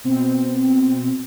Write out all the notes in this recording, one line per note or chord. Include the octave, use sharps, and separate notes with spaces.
B2 C4